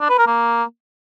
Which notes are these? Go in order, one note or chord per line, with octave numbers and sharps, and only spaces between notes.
D4
B4
A#4
A#3